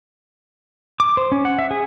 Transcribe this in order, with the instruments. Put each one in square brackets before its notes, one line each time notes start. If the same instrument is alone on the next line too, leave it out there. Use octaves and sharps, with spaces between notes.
[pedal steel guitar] D6
C5
C#4
F#5
E5
G#4